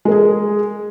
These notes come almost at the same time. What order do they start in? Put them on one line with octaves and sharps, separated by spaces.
G#3 A#4 G#4